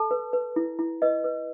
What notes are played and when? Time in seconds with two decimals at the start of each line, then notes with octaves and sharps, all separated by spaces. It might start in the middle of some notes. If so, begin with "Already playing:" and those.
Already playing: A4 A5
0.11 B4
0.33 B4
0.56 E4
0.79 E4
1.02 B4 D#5
1.24 B4